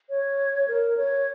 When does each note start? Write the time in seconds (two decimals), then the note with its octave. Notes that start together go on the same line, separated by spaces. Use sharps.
0.09 C#5
0.68 A#4
0.97 C#5